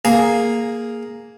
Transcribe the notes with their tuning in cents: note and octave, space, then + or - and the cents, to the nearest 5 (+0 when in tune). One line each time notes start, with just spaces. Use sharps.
A#3 +0 G#4 +0